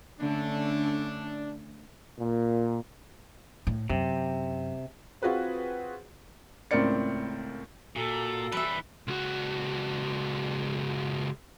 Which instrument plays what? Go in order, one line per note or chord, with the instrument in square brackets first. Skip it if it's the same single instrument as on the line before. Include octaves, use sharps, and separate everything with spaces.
[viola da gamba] D3 A3 C#4 [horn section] D4
[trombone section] A#2
[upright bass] A2
[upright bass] F#2 [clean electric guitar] C3
[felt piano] C4 F4 F#4 G#4 B4 C5
C#2 A2 C4 A#4 D5 C#7
[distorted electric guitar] A#2 [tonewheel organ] F#4 A#5 [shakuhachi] A4
[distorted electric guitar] E3 G3 [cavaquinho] B4 E5
[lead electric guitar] C#2 F#4